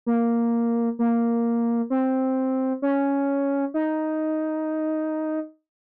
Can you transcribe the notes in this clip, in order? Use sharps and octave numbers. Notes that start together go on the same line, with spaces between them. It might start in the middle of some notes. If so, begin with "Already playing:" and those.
A#3
A#3
C4
C#4
D#4